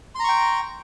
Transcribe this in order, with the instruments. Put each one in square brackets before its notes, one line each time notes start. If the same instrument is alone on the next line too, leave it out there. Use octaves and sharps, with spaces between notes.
[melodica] C6
A#5
C#6
G5